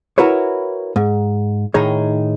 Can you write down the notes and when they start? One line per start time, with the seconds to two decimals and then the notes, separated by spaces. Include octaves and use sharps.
0.18 E4 F#4 A#4 B4 C#5
0.96 G#2
1.74 A2 D#3 D#4 G#4 C#5